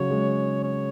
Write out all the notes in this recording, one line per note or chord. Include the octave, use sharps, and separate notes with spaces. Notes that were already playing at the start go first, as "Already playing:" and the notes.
Already playing: C#3 F#3 C#5
G#3
C#5